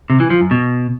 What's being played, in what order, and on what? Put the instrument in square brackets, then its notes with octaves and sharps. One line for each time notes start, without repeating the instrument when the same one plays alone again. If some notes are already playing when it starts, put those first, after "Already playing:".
[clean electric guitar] C3
E3
F3
F#2
B2